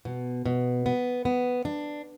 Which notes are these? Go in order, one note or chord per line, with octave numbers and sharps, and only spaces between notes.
B2
B2
B3
B3
D4